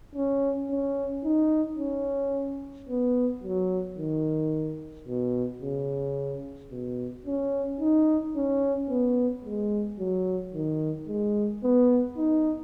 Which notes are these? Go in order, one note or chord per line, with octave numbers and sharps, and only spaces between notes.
C#4
C#4
D#4
C#4
B3
F#3
D#3
B2
C#3
B2
C#4
D#4
C#4
B3
G#3
F#3
D#3
G#3
B3
D#4